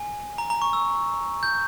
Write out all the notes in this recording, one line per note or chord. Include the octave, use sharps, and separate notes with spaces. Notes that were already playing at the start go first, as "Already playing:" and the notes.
Already playing: G#5
A#5
A#5
C#6
E6
G6